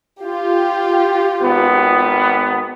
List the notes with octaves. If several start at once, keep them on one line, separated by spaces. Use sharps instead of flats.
F4 G4
G#1 B3